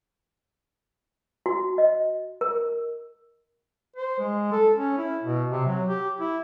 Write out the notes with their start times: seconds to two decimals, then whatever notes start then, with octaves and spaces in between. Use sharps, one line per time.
1.46 F#4
1.78 D#5
2.41 A#4
3.96 C5
4.20 G#3
4.52 A4
4.76 C#4
4.98 E4
5.23 B2
5.51 C3
5.67 F#3
5.88 G4
6.20 E4